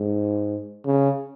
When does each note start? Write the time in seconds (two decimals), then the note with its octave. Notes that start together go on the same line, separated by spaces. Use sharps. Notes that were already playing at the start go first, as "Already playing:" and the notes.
Already playing: G#2
0.86 C#3